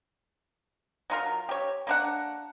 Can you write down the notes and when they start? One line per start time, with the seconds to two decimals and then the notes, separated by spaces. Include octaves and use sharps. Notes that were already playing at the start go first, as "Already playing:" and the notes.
1.10 F#3 F4 A#4
1.49 G4 C#5
1.87 A#3 D4 F#5